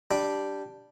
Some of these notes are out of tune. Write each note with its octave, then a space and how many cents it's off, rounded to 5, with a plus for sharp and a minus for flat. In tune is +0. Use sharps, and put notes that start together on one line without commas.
G3 +0 D4 +0